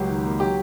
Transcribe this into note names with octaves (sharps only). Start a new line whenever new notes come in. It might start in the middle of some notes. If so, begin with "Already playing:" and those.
Already playing: C#2 F#3 G4
D#3
A#3
F#3 G4